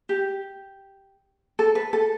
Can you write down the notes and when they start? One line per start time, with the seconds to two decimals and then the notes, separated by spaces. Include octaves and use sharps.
0.09 G4
1.59 A4
1.75 B4
1.93 A4